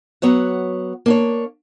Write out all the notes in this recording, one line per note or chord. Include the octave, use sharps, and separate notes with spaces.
F#3 B3 C#5 F#5
A#3 D4 C#5